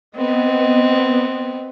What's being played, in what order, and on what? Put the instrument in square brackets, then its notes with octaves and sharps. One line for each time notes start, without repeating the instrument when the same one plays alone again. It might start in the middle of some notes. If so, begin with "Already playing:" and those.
[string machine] B3 [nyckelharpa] C4 [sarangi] D#5